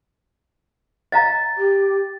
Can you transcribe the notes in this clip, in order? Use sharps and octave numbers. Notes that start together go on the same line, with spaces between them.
D#5 F5 A#5 A6
G4